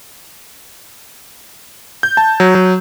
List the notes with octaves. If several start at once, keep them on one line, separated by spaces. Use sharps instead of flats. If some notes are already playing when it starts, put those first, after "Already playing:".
G6
A5
F#3
F#3